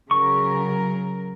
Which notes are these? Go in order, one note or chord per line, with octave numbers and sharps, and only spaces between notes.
C#3 F#3 A#4 C#6